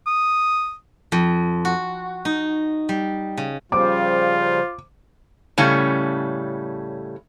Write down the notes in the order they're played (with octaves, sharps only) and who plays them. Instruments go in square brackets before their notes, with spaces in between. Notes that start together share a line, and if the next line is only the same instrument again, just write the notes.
[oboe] D#6
[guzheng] F2
F#4
D#4
G3
C#3
[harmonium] C#3 F3 G3 [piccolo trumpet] F4 [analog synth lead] C5 [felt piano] D6
[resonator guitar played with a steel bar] A2 C#3 G3 A3 C#4